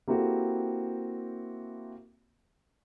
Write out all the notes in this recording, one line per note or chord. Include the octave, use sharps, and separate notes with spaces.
A#3 C4 E4 F#4 G4 A4